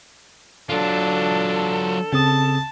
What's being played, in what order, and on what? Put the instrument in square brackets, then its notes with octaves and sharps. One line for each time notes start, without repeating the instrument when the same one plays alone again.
[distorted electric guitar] F#3 F4 [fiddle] D4 [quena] A4
[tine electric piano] C#3 C4 D#6 [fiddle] A5